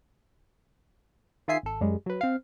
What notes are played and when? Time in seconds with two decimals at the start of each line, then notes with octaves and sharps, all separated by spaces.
1.48 D#3 F4 G#4 E5 G#5 C7
1.63 G#1 A4
1.81 F#2 G3 G#3
2.06 F#3 B4
2.21 C4 F5